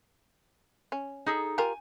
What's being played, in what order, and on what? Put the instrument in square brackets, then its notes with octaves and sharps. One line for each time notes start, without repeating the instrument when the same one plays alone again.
[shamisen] C#4
[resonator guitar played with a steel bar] D#4 G#4 A4
[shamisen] F4 G4 A#4 [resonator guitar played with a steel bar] G#5